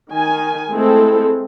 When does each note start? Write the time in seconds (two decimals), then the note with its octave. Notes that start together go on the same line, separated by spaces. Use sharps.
0.11 D#3 G#5
0.71 G#3 A3 C4 E4 A4